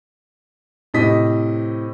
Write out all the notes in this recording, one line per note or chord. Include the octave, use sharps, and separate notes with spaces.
A2 C3 D#5 B6